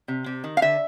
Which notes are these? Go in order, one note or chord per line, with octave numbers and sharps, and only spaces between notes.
C3
C3
D#3
F5
D3 E5